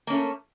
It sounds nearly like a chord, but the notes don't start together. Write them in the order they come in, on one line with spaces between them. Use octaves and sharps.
A#3 C#4 A3